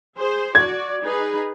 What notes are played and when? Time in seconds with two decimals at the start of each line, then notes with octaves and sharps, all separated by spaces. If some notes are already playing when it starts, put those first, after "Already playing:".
0.18 G#4 C5
0.55 F#4 D5 G#6
1.02 D#4 G#4 B4